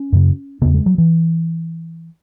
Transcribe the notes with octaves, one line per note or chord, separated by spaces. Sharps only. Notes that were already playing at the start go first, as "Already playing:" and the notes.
Already playing: C#4
F#2 C#3
E2 C#3 B3
G#3
F#3
E3